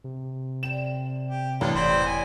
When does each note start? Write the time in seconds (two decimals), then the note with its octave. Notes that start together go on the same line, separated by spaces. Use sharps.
0.04 C3
0.63 D3 G5 E7
1.28 G4
1.61 A1 G3 D4 F4
1.74 E1 C4 C5 D5 D#5 B5
2.06 G4 G#5